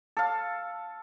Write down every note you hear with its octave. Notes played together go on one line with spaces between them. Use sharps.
A4 F5